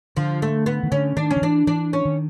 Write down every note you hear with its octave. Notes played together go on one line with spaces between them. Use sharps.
D3 F3
A3
B3
D#3
D3 C#4
D#3 D4
C#4
D#3
E3 D4
E3 D4
C#4
D#3